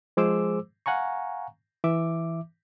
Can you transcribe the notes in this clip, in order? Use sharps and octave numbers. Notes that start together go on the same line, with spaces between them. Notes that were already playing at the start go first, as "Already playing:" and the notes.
F3 G#3 G#4 C5 D6 E6
F5 F#5 G#5 A#5 C#6
E3 E5 D6